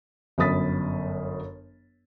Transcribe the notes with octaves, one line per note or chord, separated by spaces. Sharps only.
G1 F#2 B5 D#6 A6 B6